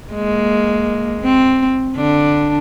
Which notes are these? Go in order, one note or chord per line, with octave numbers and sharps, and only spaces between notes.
G#3 A#3
C4
D3 D4